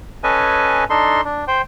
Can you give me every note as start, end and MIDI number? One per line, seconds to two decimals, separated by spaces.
0.24 0.84 61
0.24 0.84 69
0.24 0.84 71
0.24 0.84 75
0.24 0.84 80
0.90 1.21 62
0.90 1.21 63
0.90 1.21 69
0.90 1.21 84
1.25 1.45 62
1.48 1.62 72
1.48 1.62 79